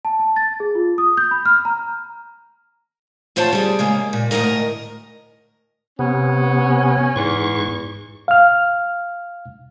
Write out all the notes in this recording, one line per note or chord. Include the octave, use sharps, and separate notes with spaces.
A5
A5
A6
G#4
F4
D#6
G6
B5
F6
A#5
D2 F4 C5 C#5 G5 A5
G3 G#4
C#3 G#3 A#3
A#2
D2 A2 C#3 A#4 D#5
C3 B3 C#4
E2 G#2 C#6
F5 F6